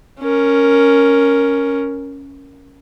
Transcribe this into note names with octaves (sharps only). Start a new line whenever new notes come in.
C#4 A#4